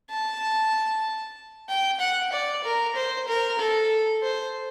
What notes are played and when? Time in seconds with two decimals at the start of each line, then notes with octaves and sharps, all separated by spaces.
0.10 A5
1.69 G5
2.00 F#5
2.33 D5
2.64 A#4
2.96 C5
3.28 A#4
3.59 A4
4.23 C5